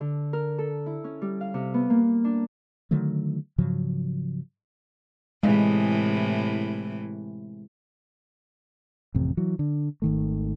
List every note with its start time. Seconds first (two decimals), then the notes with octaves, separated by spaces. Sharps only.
0.01 D3
0.33 A#4
0.58 A4
0.86 E4
1.04 C#4
1.22 G3
1.41 F5
1.54 C3
1.74 B3
1.90 A#3
2.24 D4
2.91 D3 D#3 F#3 A3
3.58 G#2 C#3 F3 F#3
5.43 A2 C3 E3 G#3
9.14 A1 F2 C3
9.37 E3 F#3
9.59 D3
10.02 G#1 D#3 A3